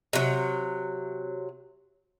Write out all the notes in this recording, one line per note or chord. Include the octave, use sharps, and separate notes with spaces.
C3 F#3